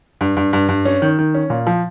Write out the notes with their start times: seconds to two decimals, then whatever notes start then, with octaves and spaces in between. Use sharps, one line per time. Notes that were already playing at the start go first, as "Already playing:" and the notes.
0.21 G2
0.37 G2
0.53 G2
0.69 G2
0.85 C#4
1.02 D#3
1.19 D#3
1.35 C#4
1.50 A#2
1.67 F3